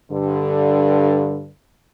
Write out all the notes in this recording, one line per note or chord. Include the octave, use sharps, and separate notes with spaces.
G2 D3